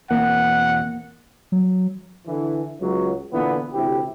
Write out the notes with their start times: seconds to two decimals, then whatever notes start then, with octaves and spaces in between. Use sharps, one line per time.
0.11 E2 B2 A#3 C4 F#5
1.52 F#3
2.26 D3 E3
2.80 C#2 F#3
3.32 A#2 D3 E3 B3
3.73 A1 D2 C3 E4 G4